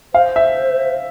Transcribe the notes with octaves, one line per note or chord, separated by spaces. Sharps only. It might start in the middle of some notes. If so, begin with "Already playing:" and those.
C5 F5
E5